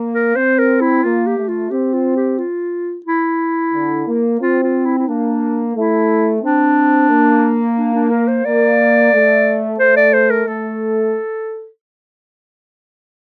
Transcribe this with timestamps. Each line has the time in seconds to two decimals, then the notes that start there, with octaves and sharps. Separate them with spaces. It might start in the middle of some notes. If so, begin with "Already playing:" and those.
Already playing: A#3
0.14 A#4
0.36 C4 C5
0.59 A#4
0.81 E4
1.04 A#3 F4
1.27 G4
1.38 A3
1.48 F4
1.71 C4 G4
1.93 F4
2.16 G4
2.38 F4
3.06 E4
3.73 D3
4.07 A#3
4.40 C4 F4
4.63 F4
4.86 E4
4.99 E4
5.08 A#3 D4
5.75 A3 E4
6.42 C4 D4
7.10 A#3
7.77 D4
7.94 D4
8.10 A#4
8.28 C5
8.45 A#3 D5
9.13 A3
9.79 A3 C5
9.96 D5
10.13 C5
10.30 A#4
10.47 A3 A4